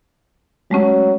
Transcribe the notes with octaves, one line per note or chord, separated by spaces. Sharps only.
F#3 G#3 A3 C#4